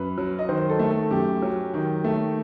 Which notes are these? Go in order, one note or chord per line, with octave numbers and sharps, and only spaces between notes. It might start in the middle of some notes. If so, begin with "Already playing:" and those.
Already playing: F#2 B4
F#3
D#5
D#3 C5
A4
A3
A4
F#2 G4
F#3
D#3
A3